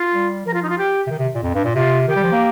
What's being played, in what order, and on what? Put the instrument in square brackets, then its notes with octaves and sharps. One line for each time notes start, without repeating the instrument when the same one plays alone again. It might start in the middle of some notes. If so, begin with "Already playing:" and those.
Already playing: [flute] F4
[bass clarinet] G3
[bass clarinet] F3 [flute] A#4
[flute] F4
D#4
F4
G4
[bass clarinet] C3
D#3
C3
A#2
F2
G2
A#2
[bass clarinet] C3 [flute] F4
[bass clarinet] D#3 [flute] G4
[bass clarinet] G3
F3
A#3